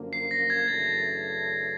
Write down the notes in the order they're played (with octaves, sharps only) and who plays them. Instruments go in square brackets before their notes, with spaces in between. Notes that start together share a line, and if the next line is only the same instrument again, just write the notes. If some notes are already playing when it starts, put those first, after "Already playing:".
Already playing: [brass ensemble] F#2 D3 F3 A#3
[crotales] C7
A#6
G#6
[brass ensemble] F#2 C#3 E3 A3 D4 [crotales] A6